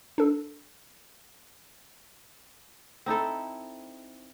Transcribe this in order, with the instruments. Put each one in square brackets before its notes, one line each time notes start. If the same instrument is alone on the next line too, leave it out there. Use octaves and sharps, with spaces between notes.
[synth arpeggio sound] D4 A4
[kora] C4 D#4 E4 A4